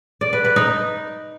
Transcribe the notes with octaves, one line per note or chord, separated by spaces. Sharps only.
D5
B4
B4
D#4